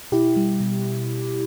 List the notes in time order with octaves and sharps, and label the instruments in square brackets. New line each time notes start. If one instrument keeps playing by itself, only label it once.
[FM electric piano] B2 E4 G4
G3
B2